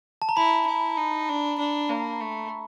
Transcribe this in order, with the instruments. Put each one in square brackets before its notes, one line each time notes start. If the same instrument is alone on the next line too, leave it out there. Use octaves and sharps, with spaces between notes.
[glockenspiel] A5
A#5
[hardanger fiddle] E4 [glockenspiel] B5
[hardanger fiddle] E4
D#4
D4
D4
A#3
A3